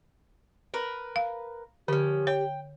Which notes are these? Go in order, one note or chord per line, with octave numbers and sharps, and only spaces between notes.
A#4 B4
F5
D3 F3 C#4 G4
C#5 G5